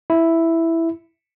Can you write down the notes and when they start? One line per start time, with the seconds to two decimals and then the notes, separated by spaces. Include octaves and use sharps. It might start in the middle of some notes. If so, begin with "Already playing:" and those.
0.10 E4